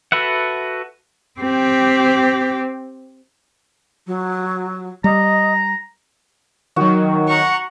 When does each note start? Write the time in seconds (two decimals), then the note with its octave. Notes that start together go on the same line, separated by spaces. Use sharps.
0.12 F#4 A4 B4 E5 F#5
1.40 C4 G4
4.07 F#3
5.04 G3 D#5 A#5
6.76 D#3 F#3 F#4
7.26 F#5 A#5 C#6